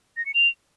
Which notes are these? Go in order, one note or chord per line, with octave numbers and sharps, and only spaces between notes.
A#6
C#7
F7